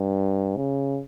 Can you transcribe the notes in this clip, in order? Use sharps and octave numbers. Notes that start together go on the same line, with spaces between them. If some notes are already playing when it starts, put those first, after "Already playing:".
Already playing: G2
C#3